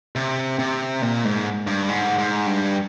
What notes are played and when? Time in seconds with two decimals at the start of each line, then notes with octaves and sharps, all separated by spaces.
0.16 C3
0.59 C3
1.02 A#2
1.25 G#2
1.67 G2
1.89 G#2
2.18 G#2
2.46 G2